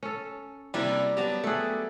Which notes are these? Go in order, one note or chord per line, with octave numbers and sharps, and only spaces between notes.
C#4 A4
C3 G3 A#3 D4 E4 A#4
F#3 B3 G4 A5 A#5
A3 G#4 A4 F#5